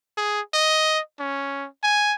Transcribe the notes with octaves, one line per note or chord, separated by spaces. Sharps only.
G#4
D#5
C#4
G#5